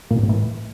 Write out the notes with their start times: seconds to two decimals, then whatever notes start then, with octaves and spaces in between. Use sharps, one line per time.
0.11 A#2
0.17 G2
0.23 A2
0.29 E3